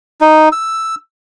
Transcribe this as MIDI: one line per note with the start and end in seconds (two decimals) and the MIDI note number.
0.21 0.49 63
0.52 0.95 88